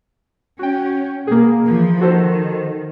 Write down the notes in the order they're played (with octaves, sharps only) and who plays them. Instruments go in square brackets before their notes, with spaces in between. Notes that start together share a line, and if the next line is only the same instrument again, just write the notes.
[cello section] C#4 [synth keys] F#4 G5
[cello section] B2 [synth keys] A#3 G#4
[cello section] E3 F3
[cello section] D#3 [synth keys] F#4 A4 C5